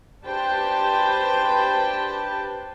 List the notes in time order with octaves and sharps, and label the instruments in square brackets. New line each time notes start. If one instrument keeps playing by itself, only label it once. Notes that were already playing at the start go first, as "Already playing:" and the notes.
[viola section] D4 G4 B4 C5 G5 A5